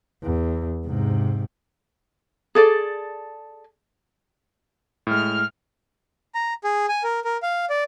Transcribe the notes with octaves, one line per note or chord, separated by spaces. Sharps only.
E2
G#2 C3
G#4 A4 D5
A2 G#3 F6
A#5
G#4
G#5
A#4
A#4
F5
D5